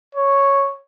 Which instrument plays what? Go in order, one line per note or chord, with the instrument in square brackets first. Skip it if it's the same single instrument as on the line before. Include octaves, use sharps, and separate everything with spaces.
[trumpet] C#5